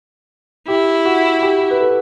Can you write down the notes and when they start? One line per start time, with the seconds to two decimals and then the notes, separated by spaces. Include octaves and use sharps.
0.67 E4 G4
1.05 F#4
1.42 G4
1.71 B4
1.81 A4